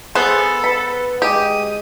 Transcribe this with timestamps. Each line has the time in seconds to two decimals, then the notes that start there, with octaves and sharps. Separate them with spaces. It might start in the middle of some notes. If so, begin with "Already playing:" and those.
0.15 B3 G#4 A4 C5
0.64 B4 B5
1.22 G#3 G4 D#6